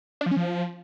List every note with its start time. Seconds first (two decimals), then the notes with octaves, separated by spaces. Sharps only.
0.21 D4
0.26 F3
0.31 C#4
0.36 F3